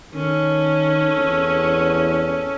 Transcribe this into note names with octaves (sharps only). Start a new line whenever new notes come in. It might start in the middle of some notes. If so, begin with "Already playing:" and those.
D#3 C#4 A4
E2